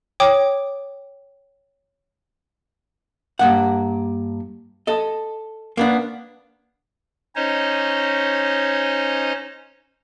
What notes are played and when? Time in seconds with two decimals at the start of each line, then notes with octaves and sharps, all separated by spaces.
0.20 C#5 G5 D6 D#6
3.39 G2 A#3 F#5
4.87 A4 D#5
5.77 A#3 B3 D4
7.35 C#4 D#4 C5 C#5 D#5